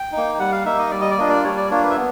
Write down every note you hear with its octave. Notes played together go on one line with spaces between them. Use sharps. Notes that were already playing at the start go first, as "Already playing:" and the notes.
Already playing: G5
D#4
A#3
G3 F#5
F5
A#3 D#4 E5
D#5
G3 D5
D#5
D5
A#3 D4 F4 D#5
D5
G3 C#5
D5
A#3 D4 F4 C#5
B4
E5
B3